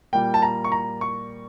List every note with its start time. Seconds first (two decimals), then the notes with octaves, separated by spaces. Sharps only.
0.13 A#2 G3 A#3 G5
0.34 A5
0.42 A#5
0.64 C#6
0.72 A#5
1.01 C#6